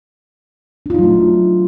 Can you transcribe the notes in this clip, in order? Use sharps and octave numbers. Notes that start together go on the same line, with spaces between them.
F#3 A3 D4 D#4 F4